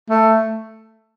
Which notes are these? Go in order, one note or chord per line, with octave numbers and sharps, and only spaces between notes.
A3